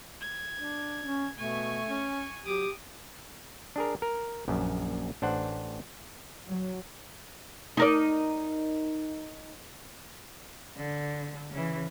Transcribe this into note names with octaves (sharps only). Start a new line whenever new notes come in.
G#6
D4
C#4
B2 A3 G#5 C#6
C#4
F#3 G4 D6 D#6
D4 G#4 A#4
A#4
A#1 F#2
A1 D4 C5 F#5
F#3
D#4 A#4 D5
D3
C#3 E3